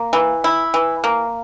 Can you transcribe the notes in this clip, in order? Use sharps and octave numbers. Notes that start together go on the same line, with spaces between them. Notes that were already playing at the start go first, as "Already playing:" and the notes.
Already playing: A#3
E3
E4
E3
A#3